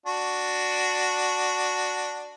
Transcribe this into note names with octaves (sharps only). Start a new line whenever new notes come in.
D4 F#4